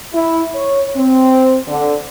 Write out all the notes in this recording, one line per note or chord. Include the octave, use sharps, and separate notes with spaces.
E4
C#5
C4
D3